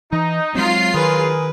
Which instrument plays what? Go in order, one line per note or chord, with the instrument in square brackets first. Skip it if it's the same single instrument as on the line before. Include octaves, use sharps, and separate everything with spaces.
[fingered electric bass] E3 [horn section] D#4
[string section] F#3 F4 C7 [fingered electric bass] G#3 A3 C4
[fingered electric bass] D#3 [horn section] G#4 A#4 [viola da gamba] B4